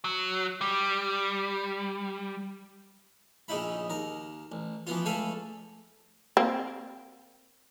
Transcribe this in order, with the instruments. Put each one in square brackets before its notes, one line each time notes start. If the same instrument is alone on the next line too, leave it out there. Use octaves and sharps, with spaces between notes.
[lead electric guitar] F#3
G3
[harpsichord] A#1 C#3 D#4 E4 B5
D#2 A#4
A1
E3 F3 B3 F4
C#2 A3 A4 F5 G#5 B5
[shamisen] A#3 C4